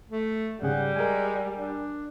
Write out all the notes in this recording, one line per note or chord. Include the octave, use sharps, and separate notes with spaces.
A3
G#2 C#3 G3 G#4 F#5
G#3 A#4 G#5
D4